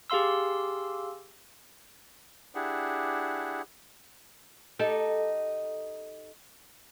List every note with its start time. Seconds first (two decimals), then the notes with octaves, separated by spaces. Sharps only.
0.10 G4 G#4 F5 C6 E6
2.55 D4 E4 G4 G#4 F#5
4.79 D#4 G4 A4